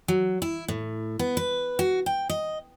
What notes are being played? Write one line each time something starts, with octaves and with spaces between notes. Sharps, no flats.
F#3
E4
A2
B3
B4
F#4
G5
D#5